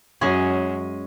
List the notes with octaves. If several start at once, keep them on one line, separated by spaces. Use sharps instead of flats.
F#2 G#3 C#4 G#4